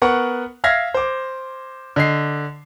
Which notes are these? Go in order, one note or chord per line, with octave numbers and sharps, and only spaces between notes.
B3 A#4 F#5 C#6
E5 F5 F6 G#6 A#6 C7
C5 D6
D3 D#5 C7